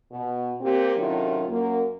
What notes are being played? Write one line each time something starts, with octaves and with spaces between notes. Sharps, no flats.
B2
A#2 C4 G4
A2 C3 D#3 F#3 C#4 F4
F#2 A#3